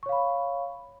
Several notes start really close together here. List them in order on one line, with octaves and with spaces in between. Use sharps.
C#6 C#5 F5 B5